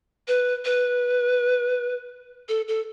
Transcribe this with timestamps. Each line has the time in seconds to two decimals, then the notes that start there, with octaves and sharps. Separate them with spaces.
0.28 B4
0.65 B4
2.49 A4
2.68 A4